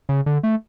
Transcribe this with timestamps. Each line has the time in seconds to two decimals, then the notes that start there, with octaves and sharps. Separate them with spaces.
0.09 C#3
0.26 D3
0.43 A3